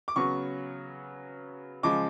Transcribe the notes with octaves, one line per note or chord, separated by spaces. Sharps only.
D6
C#3 F#3 B3 C#6
C#3 F3 G#3 D6